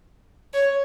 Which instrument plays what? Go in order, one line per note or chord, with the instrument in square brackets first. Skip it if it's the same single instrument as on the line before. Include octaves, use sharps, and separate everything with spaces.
[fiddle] C#5